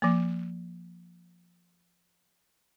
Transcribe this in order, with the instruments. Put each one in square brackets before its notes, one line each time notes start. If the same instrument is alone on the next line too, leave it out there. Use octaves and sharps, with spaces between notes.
[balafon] F3 A#3